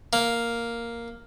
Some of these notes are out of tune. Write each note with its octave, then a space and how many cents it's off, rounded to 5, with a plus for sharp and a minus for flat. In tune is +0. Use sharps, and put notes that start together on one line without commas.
A#3 +0